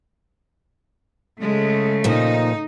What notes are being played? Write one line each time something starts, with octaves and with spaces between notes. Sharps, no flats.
C#3 G#3 A3
A#2 F3 D#4